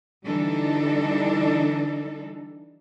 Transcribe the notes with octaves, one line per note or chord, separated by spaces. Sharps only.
D3 E3 G3 D4 D#4 A4